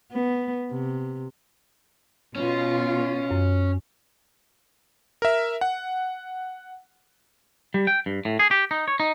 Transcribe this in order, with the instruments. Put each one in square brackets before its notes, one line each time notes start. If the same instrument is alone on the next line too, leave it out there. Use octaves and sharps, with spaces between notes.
[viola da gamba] B3
C3
[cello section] B2 F4 [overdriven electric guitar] C#4
[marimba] F#2
[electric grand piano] A#4 E5
F#5
[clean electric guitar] G3
G5
G2
A2
G#4
G4
D#4
C#5
D#4